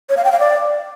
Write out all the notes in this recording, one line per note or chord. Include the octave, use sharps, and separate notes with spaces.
C#5
F5
G5
F5
D5